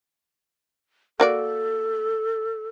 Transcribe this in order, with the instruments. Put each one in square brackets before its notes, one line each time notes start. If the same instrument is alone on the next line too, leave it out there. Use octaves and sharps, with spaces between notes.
[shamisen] A#3 F#4 D5 [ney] A4